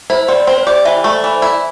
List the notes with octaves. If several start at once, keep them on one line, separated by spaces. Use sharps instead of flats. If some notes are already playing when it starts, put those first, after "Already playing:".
E4 C5
C4 D5
C4 C5
C5
G4 D5
E3 E5
A3
E3
E4